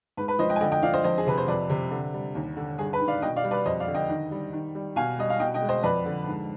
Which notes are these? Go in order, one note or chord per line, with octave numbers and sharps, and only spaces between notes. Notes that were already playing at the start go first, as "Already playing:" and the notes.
G#2 B4
B4
F3 C5 D#5
D#5 G5
G#5
D3 D#5 G5
D#5 G5
F3 D5 F5
C5 D#5
F2 C5 D#5
G#4
C3 B4
C5
F2 B4 D5
C3
D3
G3
D#2
D3
G2 G#4
B4
D#3
D5 F5
B2 D#5 G5
D5 F5
G3
B4 D5
F2 C5 D#5
D5 F5
D3
D#5 G5
D#3
G3
D#3
G3
B2 F5 G#5
G3 D#5
F5
B2 D#5 G5
D#5 G5
G#3
C5 D#5
F2 B4 D5
D3
G#2